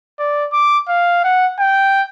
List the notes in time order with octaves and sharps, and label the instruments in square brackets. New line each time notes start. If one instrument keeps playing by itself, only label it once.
[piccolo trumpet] D5
D6
F5
F#5
G5